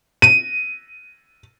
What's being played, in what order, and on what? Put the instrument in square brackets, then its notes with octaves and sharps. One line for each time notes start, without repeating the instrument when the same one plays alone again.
[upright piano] D#7